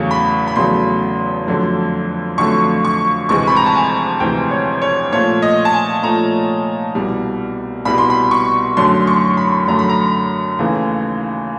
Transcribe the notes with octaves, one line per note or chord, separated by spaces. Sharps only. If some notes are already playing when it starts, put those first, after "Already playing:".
Already playing: E2 C#3 F#3 A3 C#6
B5
B5
E2 C#3 F#3 A3 C6
F2 D3 F#3 A3
F2 D3 F#3 A3 C#6
C#6
D2 C3 E3 G#3 C#6
B5
A#5
A5
G#5
D2 C3 E3 G#3 G5
C#5
C#5
A#2 F3 A3 C#5
D#5
A5
G#5
A#2 F3 A3 A#5
C2 B2 G3
C2 B2 G3 B5
C6
B5
C#6
F#2 D3 F#3 A3 C6
C#6
B5
F#2 D3 F#3 A3 A#5
B5
A#5
D#2 C#3 E3 A3